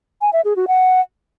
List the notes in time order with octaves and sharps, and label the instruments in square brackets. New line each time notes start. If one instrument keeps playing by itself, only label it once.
[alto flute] G#5
E5
G#4
F#4
F#5